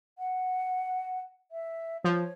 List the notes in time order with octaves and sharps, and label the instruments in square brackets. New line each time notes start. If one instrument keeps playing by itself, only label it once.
[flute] F#5
E5
[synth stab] F3 [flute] C#5